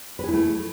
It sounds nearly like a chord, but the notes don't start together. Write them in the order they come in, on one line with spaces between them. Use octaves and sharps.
B4 G#4 E4 A3